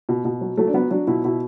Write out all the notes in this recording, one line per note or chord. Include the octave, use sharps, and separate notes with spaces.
B2
B2
F#3
F#3 A3
D4
F#3 B3
F#3 D4
B2 E4
B2 E4